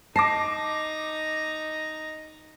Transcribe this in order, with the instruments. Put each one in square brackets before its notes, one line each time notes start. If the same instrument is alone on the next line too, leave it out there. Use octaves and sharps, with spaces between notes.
[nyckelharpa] D#4 A#5 [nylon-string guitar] A5 [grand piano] D6 A#6 C7